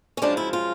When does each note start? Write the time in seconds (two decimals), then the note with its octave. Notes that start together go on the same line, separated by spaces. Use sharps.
0.17 C#4
0.22 F#2 C#3 F3 G#3 D4
0.37 E4
0.53 F4